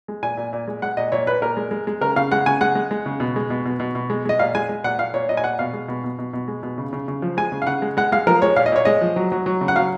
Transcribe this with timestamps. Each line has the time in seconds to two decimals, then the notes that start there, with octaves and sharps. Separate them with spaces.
0.08 G#3
0.23 A#2 G#5
0.37 A#2
0.53 A#2
0.68 G#3
0.82 G#3 F#5
0.97 A#2 D#5
1.12 A#2 C#5
1.27 A#2 B4
1.42 A#2 A#4
1.57 G#3
1.71 G#3
1.87 G#3
2.01 C#3 A#4
2.16 C#3 F5
2.32 G#3 F#5
2.46 C#3 G#5
2.61 G#3 F#5
2.75 G#3
2.91 G#3
3.06 C#3
3.20 B2
3.36 G#3
3.50 B2
3.65 B2
3.80 B2
3.95 B2
4.10 G#3
4.25 G#3 D#5
4.39 A#2 F5
4.55 G#3 G#5
4.69 G#3
4.84 A#2 F#5
4.99 A#2 F5
5.14 A#2 C#5
5.29 A#2 D#5
5.37 G#5
5.44 A#2 F#5
5.59 B2 F5
5.73 G#3
5.88 B2
6.04 B2
6.18 B2
6.33 B2
6.48 G#3
6.63 B2
6.78 C#3
6.93 C#3
7.08 C#3
7.22 F3
7.37 G#3 G#5
7.52 C#3
7.62 F5
7.67 C#3 F#5
7.82 G#3
7.97 G#3 F#5
8.12 G#3 F5
8.27 F3 A#4
8.42 G#3 C#5
8.56 A#2 F5
8.66 D#5
8.72 A#2 C#5
8.85 G#3 D#5
9.01 F3
9.16 F#3
9.32 F#3
9.46 F#3
9.61 C#3
9.68 F#5
9.76 F#3 F5